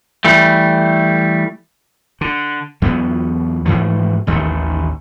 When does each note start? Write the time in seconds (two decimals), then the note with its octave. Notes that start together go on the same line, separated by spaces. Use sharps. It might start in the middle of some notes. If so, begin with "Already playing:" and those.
0.25 E3 G3 A3
2.21 D3
2.82 E2 F#3 B3
3.66 G#2 E3 F3 A3
4.27 A1 D#2 D#3 A3